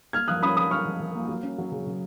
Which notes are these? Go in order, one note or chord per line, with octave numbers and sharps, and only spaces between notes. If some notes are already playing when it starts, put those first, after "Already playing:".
A#3 F6 G#6
F3 D#6 F#6
C#4 B5 D#6
F3 B5 D#6
C#4 C#6 F6
F3
F3
A#3
F#3
C#4
F#3
C#3
C#3